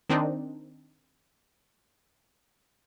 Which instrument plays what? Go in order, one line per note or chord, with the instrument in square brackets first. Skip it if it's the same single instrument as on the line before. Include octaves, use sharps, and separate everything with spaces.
[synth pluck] D#3 C4 D4 D#4